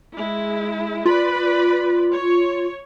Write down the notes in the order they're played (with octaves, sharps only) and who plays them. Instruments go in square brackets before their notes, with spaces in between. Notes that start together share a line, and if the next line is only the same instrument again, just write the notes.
[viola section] G#3 E4
[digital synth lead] F4 [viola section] B4 D5 B5
[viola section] C#5